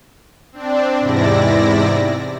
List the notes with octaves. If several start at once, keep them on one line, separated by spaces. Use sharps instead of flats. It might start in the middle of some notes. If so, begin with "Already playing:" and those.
C4 D4
E2 G#2 C3 E4 D5 A#6